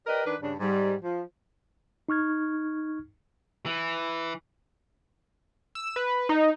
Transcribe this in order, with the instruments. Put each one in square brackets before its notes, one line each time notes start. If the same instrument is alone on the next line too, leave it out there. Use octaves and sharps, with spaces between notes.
[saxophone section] G4 A#4 B4 D5 D#5
D#3 D4 B4
G2 C#3 C#4 D4
G#2 G3
F3
[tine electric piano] D#4 C#6 F6 G#6
[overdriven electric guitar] E3
[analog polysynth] E6
B4
D#4